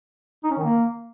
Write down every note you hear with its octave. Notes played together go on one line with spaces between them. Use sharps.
D#4
C#4
D#3
A#3